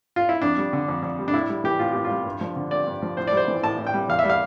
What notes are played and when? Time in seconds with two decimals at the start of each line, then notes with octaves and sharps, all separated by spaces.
0.16 F4
0.29 E4
0.41 F2 D4
0.57 G3
0.73 D3
0.88 F2
1.03 F2
1.19 G3
1.28 D4
1.33 A2 E4
1.49 G3
1.64 E3 G4
1.79 A2 F4
1.93 A2 G4
2.04 F4
2.10 G3
2.26 G2
2.41 F3
2.56 D3
2.71 G2 D5
2.87 G2
3.02 F3
3.17 A2 C5
3.27 D5
3.33 G3 C5
3.48 E3
3.63 A2 A5
3.78 A2
3.87 G5
3.94 G3
4.09 E2 F5
4.19 E5
4.25 G3 F5